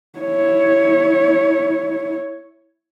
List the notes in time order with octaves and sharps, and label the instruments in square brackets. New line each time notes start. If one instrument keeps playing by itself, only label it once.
[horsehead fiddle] E4 C#5